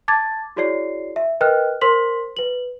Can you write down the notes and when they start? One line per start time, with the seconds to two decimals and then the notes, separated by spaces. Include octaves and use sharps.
0.08 A5 D6 G#6 A6
0.56 E4 F#4 G#4 C#5 D5 C7
1.16 E5
1.41 A#4 B4 D#5 G5 F6 F#6
1.81 A#4 C5 C6 B6 F#7
2.37 B4 F#7